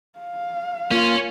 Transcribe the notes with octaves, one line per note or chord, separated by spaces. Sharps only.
F5
A#3 C#4 F4